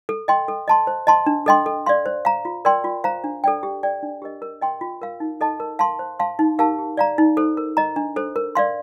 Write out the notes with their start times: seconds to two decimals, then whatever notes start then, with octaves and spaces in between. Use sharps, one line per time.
0.09 A4
0.28 D#5 G5 C6
0.48 A4
0.68 D#5 A5 C6
0.87 C5
1.07 D#5 A5 C6
1.26 D4
1.46 A4 D#5 G5 C6
1.66 A4
1.86 D5 F5 C6
2.06 C5
2.25 F5 A#5
2.45 F4
2.65 A#4 D5 G5 C6
2.84 F4
3.04 C5 F5 A#5
3.24 D4
3.44 A4 D5 G5
3.63 G4
3.83 D5 G5
4.03 D4
4.22 G4 A#4 D#5
4.42 A#4
4.61 D#5 G5 C6
4.81 F4
5.02 A#4 F5
5.20 D#4
5.41 A4 D#5 A5
5.60 A#4
5.79 F5 A5 C6
5.99 C5
6.19 F5 A5 C6
6.39 D#4
6.59 G4 A#4 F5 A5
6.78 G4
6.97 D5 F5 A#5
7.18 D#4
7.37 A4 C5
7.57 A#4
7.77 D#5 A#5
7.96 D4
8.16 A4 C5
8.36 A#4
8.55 D5 F5 C6